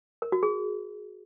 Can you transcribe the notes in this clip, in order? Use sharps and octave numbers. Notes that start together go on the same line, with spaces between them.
A#4
F#4
G#4